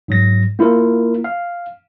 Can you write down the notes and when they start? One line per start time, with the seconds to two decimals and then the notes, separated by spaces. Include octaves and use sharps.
0.08 G#2 F#3 A#6
0.59 A#3 E4 F4 A#4
1.24 F5